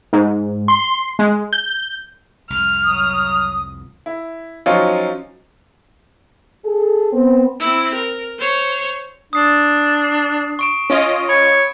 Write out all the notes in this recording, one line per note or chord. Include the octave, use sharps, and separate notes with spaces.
G#2
C6
G#3
G6
C2 F2 F6
F#3 D#6
E4
F3 F#3 C#4 D#4 F4
G#4 A4
B3 C4
C4 E4
A#4
C5 C#5
D4 D#6 C7
C7
C#6 D7 E7
C#4 F4 D#5
C#5 B5